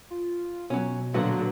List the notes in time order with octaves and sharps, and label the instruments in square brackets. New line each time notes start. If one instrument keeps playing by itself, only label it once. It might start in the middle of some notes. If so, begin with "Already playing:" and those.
[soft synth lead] F4
[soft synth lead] B2 [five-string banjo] F#3 C#4
[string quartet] A#2 D3 F#3 [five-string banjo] F3 B3 F#4